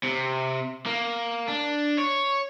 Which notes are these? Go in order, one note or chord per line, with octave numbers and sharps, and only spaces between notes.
C3
A#3
D4
C#5